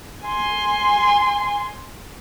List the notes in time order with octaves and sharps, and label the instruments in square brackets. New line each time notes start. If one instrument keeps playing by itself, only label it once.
[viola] G#5 C6